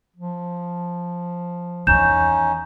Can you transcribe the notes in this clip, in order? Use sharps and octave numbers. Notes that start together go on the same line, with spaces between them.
F3
E2 D#3 C#4 D#4 G6 E7